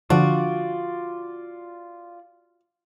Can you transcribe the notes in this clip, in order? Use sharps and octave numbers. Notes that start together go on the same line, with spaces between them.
D3 F3 D4 F4 F#4 D5